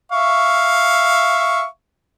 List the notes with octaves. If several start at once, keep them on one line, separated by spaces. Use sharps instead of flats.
E5 F5 C#6